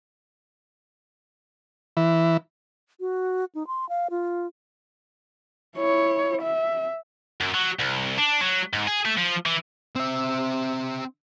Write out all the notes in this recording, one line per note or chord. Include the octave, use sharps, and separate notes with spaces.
E3
F#4
D#4
C6
F5
F4
E4 C#5
E5
F#2
F#3
C2
D4
F#3
G#2
G#4
A3
F3
E3
C4 E5